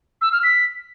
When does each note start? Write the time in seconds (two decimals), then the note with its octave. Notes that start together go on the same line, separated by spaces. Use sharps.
0.21 E6
0.32 F6
0.43 B6